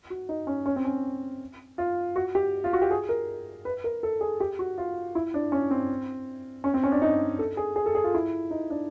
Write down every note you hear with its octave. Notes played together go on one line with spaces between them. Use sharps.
F#4
D#4
C#4
C#4
C4
C#4
F4
F#4
G4
F4
F#4
G4
G#4
A#4
B4
A#4
A4
G#4
G4
F#4
F4
E4
D4
C#4
C4
C#4
C4
C#4
D4
D#4
A4
G#4
G#4
A4
G#4
F4
E4
D#4
D4